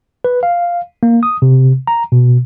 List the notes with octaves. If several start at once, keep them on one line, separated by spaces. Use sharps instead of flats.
B4
F5
A#3
D#6
C3
A#5
B2